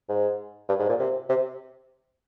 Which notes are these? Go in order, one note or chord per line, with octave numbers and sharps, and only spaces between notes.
G#2
G2
G#2
A#2
C3
C3